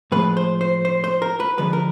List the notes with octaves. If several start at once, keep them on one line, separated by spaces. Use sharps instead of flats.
A2 F3 G#3 B4
C5
C5
C5
C5
A#4
B4
D3 F3 G#3 B4
A#4